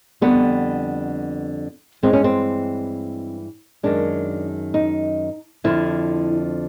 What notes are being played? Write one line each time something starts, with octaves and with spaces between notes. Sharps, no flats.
F2 D3 G3 B3
G2 E3 G#3 C4
C#4
C4
F#2 D#3 G#3 D4
D#4
F2 D3 F3 E4